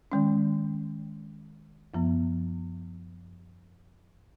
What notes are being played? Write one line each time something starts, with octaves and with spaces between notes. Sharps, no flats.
D#3 G#3 C#4
F#2 F3 B3